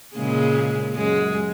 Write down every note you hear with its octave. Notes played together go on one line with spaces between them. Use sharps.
A#2 C#3 G#3
F#2 G#3